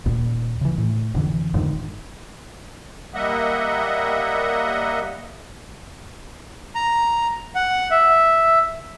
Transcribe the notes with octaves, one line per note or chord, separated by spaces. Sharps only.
D#1 D#2 A#2
C#3 E3
A2
F1 D3 E3
F1 G#2 D3 D#3
G3 A#3 D#5 E5 F#5
A#5
F#5
E5